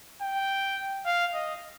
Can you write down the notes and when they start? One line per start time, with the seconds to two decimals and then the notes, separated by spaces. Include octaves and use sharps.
0.22 G5
1.06 F5
1.34 D#5